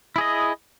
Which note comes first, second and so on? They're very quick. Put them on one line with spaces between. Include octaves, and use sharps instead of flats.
E4 G#4 D#5